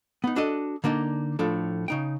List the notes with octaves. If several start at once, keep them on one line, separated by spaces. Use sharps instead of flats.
B3 D#4
D4 F#4 A4 D#5
D3 A#3 D4 D#4
A2 F3 D4 A4
C#3 D#4 G5